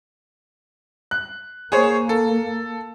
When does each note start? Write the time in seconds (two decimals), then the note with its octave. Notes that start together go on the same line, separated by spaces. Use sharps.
1.11 F#6
1.72 A#3 G#4 C5 C#5
2.09 A4